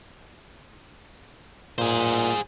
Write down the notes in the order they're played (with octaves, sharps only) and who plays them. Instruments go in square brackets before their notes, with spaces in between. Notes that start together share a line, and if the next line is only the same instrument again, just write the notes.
[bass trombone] A#2 [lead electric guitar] G#4 C5